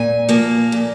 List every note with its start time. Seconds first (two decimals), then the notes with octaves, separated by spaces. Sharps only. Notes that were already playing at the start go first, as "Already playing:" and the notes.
Already playing: A#2 G#5
0.29 F3 A#3
0.72 A#2